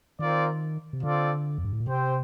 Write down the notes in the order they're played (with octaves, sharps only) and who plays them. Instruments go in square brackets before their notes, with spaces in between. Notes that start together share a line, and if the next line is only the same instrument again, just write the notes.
[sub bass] D#3 [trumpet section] C4 F4 A#4 D5
[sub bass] C3
[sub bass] D3 [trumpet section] C4 F4 A4 D5
[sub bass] F2
G2
A2
A#2
[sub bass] C3 [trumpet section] C4 G4 C5 G5